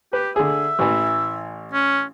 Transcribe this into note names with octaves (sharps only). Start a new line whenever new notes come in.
G4 B4
D3 G#4 E5
A1 E3
C#4